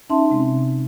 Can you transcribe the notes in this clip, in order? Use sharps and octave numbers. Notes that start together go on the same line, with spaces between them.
C#4 D#4 E5 A5 C6
C3 G#3 C4